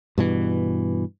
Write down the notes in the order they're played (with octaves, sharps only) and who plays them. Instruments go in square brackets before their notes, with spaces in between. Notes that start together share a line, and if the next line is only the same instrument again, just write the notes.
[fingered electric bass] G2 B2 E3